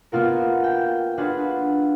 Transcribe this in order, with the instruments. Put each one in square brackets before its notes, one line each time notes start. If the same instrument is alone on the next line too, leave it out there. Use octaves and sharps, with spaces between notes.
[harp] A#3 B3 F4 F#4 A#4
G5
D4 F4 F#4 G#4 B4